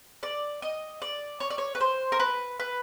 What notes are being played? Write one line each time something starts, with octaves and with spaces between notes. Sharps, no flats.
D5
D#5
D5
C#5
D5
C#5
B4
C5
A#4
B4
B4